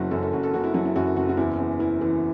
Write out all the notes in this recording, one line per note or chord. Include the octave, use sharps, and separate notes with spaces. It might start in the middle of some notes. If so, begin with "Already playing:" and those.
Already playing: F#1 F#3 E4 F#4
F#2 A4
A4
F#1 F#4
A4
F#1 F#4
E4
F#3 E4
E4
F#2 F#4
F#1 F#4
F#4
E2 E4
E2
E3 E4
E3